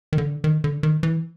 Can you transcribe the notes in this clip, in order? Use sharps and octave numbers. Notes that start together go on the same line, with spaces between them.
D#3
D3
D#3
D3
D#3
E3